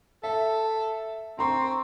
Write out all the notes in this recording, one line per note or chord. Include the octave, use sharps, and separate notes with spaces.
A4 E5
C4 A#5 C6 C#6